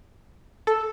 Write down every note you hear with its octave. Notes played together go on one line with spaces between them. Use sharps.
A4